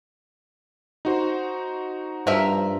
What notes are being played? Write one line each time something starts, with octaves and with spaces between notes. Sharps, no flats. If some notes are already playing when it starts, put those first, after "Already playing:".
D#4 F#4 C5
G2 F3 A#4 E5